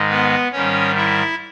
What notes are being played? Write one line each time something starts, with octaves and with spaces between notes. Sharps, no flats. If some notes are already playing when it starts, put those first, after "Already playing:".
Already playing: G#2 D#3 G#3
B3 B4
G#2 D#3 G3 C#4 C#5
E4 E5